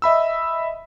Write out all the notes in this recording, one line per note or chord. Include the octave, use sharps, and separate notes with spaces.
D#5 E5 B5 E6